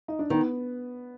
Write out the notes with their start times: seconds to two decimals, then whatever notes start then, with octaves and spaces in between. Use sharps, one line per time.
0.08 D#4
0.19 D4
0.30 D#3 B3